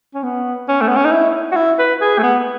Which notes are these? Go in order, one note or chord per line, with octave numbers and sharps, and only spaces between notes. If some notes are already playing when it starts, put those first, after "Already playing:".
C#4
B3
C#4
A3
B3
C#4
D#4
E4
F#4
E4
B4
G#4
A3
B3